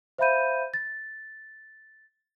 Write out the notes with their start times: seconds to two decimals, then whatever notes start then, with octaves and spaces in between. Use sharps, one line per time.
0.18 C5 E5 F5 B5 G6 D#7
0.74 A6